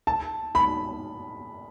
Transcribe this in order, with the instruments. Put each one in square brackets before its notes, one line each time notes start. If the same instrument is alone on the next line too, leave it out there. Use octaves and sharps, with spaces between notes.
[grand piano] A5
B5